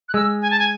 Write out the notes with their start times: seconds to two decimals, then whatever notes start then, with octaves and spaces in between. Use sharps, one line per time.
0.09 F#6
0.14 G#3 E6
0.42 G#5
0.50 A5
0.59 G#5